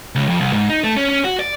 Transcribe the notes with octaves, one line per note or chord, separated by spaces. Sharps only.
C#2
F2
C2
G#2
D#4
A3
C#4
C#4
F#4
D5